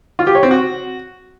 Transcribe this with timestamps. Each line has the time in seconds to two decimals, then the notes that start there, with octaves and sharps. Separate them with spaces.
0.19 F4
0.27 G4
0.35 C#5
0.43 C4
0.51 F#4